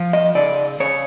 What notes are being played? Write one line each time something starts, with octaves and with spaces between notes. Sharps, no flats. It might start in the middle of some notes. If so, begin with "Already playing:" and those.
Already playing: F3
D#5
C#3 D5
C#3 C#5